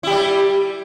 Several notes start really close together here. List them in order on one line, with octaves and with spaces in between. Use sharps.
E4 G4 G3